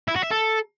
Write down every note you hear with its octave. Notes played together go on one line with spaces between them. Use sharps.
E4
F#4
E5
A4